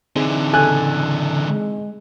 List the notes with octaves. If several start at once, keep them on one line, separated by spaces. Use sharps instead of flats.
D3 E3 C4 D#4 G#4
C#3 A4 G#5 F#6
G#3